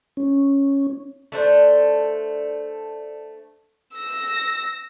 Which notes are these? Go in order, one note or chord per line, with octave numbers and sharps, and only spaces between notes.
C#4
A3 D4 C5
E6 A#6